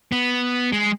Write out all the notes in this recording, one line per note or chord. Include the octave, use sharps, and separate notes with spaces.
B3
G#3